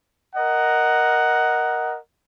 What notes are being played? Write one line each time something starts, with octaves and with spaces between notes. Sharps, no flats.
A#4 D#5 F#5